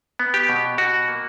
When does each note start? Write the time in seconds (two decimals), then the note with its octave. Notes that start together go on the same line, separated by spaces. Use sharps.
0.19 B3
0.34 G4
0.49 B2
0.78 B2 F#4
1.08 A#3